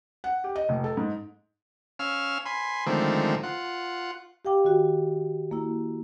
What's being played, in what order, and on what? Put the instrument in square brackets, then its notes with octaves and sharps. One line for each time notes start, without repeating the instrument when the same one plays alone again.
[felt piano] F#5
G4
D#5
F1
A4
G#2
[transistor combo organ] C#4 F5 E6 F6
G#5 B5 C6
D3 D#3 F3 G#3 A3 C4
F4 F#5
[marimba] G4 F5 G5 D6
D#3 F#4 G5
A#3 E4